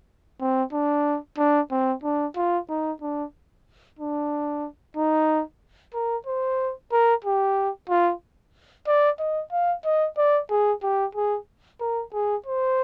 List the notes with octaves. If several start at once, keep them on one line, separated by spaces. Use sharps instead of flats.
C4
D4
D4
C4
D4
F4
D#4
D4
D4
D#4
A#4
C5
A#4
G4
F4
D5
D#5
F5
D#5
D5
G#4
G4
G#4
A#4
G#4
C5